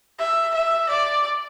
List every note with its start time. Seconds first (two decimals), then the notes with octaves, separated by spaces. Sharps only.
0.19 E5
0.54 E5
0.89 D5